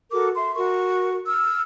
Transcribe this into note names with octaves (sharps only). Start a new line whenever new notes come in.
F#4 A4 A#4 D6
E5 C6
F#4 A#4 C#6
E6 F6